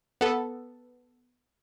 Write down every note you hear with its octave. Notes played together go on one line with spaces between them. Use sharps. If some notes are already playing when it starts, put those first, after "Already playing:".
B3 A4